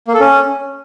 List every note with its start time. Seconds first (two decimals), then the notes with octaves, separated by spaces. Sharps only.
0.08 A#3
0.14 A4
0.20 C#4